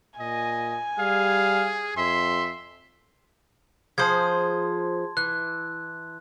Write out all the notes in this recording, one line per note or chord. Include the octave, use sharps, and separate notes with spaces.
A#2 D#5 G#5
G3 G#4 F5
F2 E5 C6
F3 G#4 C5 A5 C6 G#6
E3 F#6